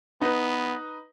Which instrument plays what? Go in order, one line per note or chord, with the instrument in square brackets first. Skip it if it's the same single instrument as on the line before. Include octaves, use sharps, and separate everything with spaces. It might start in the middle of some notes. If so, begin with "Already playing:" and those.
[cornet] B3 [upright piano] D#4 B4